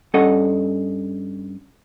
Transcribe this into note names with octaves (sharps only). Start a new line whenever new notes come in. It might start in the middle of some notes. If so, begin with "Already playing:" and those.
G2 C#4 A4 D#5 F#5